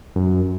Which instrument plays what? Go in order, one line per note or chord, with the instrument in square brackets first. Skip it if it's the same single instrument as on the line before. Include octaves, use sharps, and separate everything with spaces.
[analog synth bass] F#2